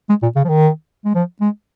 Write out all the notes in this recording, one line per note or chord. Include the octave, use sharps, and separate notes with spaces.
G#3
A#2
C#3
F3
D#3
G#3
F3
G#3